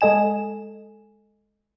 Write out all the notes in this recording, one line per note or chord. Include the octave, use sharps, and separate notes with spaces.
G#3 A4 D#5 G#5 E7